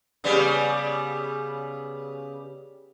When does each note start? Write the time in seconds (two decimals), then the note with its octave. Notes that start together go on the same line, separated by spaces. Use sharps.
0.24 C#3 G3 B3